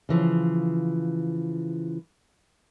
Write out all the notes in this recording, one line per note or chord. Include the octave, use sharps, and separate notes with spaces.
C#3 E3 F3